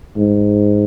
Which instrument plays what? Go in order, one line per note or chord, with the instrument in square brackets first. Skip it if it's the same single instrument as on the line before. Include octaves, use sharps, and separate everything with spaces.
[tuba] G#2